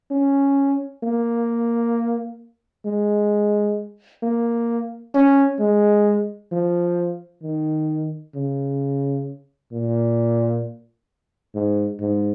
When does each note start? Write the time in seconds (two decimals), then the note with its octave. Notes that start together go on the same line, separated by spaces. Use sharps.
0.10 C#4
1.03 A#3
2.85 G#3
4.23 A#3
5.14 C#4
5.60 G#3
6.52 F3
7.43 D#3
8.35 C#3
9.72 A#2
11.55 G#2
12.00 G#2